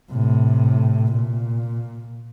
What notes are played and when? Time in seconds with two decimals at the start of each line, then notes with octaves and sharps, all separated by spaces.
0.11 A2 C3
1.12 A#2